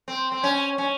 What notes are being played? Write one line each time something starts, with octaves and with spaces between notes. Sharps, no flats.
C4
C4
C#4
C#4